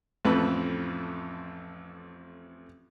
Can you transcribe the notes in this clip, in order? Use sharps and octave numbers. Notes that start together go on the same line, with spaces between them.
A1 F2 F3 A3 B4